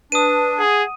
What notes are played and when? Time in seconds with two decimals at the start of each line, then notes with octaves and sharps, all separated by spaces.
0.12 D4 B4 D#6 D#7
0.59 G#4 F#5